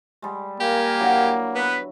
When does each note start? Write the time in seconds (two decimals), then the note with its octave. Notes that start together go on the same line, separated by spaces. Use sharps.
0.22 G3 G#3
0.60 A#3 G4 A#4 F5 G#5
1.00 D3 F#3 E4
1.56 B3 B4